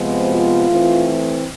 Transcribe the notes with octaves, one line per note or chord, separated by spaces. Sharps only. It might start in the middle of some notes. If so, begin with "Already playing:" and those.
Already playing: C3 F3 G#3 B3
F4
E3 A3 C4